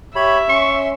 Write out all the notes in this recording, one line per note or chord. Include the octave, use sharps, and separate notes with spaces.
G4 C#5 E5 B5
C#4 C6 C#6